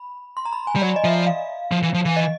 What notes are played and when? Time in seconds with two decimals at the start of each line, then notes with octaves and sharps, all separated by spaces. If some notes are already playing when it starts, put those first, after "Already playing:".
Already playing: B5
0.37 C6
0.45 A#5
0.53 B5
0.67 G#5
0.76 G3
0.82 F#3 D5
0.96 D#5
1.04 F3 E5
1.27 F5
1.72 F3
1.83 E3
1.94 F3
2.05 E3
2.17 D#5